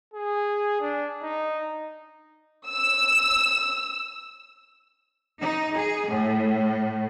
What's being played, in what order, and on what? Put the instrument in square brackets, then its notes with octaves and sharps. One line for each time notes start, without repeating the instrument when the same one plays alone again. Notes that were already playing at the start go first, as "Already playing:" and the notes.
[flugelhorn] G#4
D4
D#4
[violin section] E6
[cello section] D#4
G#4
A2